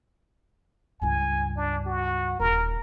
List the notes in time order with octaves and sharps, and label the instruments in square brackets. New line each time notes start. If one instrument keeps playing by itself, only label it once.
[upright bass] C#2 G2 [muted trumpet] G#5
[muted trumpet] D4
F#4
[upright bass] D#1 [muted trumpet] A#4